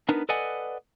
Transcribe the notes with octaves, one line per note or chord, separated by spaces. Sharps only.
B3 D4 D#4 A#4 B4
A4 B4 D5 D#5 F#5 G#5